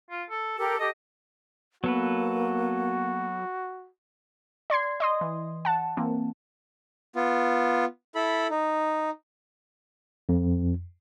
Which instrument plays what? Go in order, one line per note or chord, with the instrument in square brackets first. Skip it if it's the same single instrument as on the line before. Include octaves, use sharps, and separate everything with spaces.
[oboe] F4
A4
[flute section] G4 A#4 [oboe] A4
[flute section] G4 A4 [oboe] D#5
[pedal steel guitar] F#3 A4 B4 [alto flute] A#3 [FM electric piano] B3 [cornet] F#4
[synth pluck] D5 C6 G#6 C7
D#5 C6 D#6
E3
F#5 A5
E3 A#3 C4
[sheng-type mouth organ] B3 F4
E4 A4 B5
D#4
[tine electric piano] F2